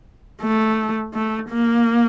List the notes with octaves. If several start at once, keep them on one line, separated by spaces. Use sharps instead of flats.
A3
A3
A#3